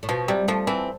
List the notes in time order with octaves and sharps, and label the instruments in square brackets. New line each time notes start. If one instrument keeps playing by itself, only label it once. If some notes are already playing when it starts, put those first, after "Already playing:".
[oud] A2
[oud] B2 [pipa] F3
[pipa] C3 [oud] G3
[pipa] F3 [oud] A3
[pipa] E3 [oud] C4